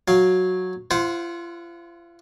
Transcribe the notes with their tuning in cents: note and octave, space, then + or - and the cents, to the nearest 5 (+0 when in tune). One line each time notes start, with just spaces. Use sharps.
F#3 -10 F5 +0
F4 -40 C5 -5 F#5 -20